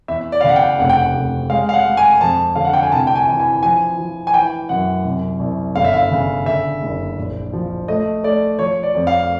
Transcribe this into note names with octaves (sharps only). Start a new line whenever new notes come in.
E2 E5
D5
F5
C#3 F#5
G5
F1 F#5
G5
F#5
F1
G#3 F5
F5
F#5
G#3
G#5
F2 A5
D3 F5
F#5
G5
G#5
C2 A5
G5
G#5
E3
G#5
F3 G#5
F3
G#5
E3 G5
F#2 F#5
C2
C2
G1 F5
E5
F5
C#3
D3 E5
F#1
A#1
F3
A3 D#5
A3 D5
F3 C#5
D5
F2
F5